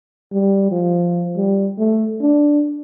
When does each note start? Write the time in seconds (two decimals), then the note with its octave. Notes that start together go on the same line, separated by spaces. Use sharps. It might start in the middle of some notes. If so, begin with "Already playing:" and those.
0.32 G3
0.71 F3
1.36 G3
1.78 A3
2.21 D4